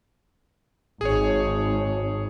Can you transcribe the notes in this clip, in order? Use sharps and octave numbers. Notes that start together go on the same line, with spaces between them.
G#1 G#4 C#5